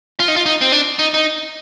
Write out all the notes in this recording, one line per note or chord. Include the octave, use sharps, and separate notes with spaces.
F4
D#4
F4
D#4
C4
D4
D#4
D#4